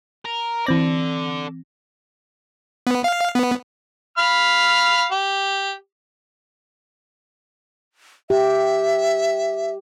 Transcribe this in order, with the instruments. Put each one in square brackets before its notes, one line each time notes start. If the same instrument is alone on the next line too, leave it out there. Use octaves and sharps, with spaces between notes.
[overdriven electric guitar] A#4
[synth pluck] E3 C4 A#6 [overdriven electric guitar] A4 D5
[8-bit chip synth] B3
F5
B3
[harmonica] F5 B5 F6
G4
[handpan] G4 [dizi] E5